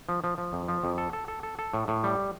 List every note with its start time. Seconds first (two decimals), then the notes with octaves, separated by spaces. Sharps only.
0.09 F3
0.24 F3
0.38 F3
0.53 F2
0.68 F3
0.84 F2
0.98 A4
1.13 A4
1.28 A4
1.43 A4
1.59 A4
1.74 A2
1.88 A2
2.04 G3